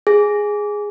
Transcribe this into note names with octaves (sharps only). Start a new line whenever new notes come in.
G#4